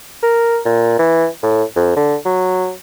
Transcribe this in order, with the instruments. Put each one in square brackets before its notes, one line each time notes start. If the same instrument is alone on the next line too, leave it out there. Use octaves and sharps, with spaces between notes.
[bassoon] A#4
A#2
E3
A2
F2
D3
F#3